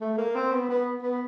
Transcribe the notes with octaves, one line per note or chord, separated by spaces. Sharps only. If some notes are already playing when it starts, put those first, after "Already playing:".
A3
A#3
C4
B3
B3
B3